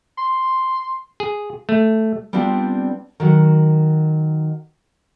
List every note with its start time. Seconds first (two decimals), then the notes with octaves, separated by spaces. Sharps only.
0.18 C6
1.20 G#4
1.69 A3
2.33 G3 B3 C4 D4 F4
3.20 D#3 F#3 F#4